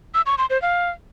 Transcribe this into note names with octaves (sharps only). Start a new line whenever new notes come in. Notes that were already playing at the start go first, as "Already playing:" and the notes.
E6
C#6
C6
C5
F5